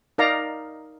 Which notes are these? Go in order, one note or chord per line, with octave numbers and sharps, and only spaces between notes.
D#4 A#4 D5 F5 A#5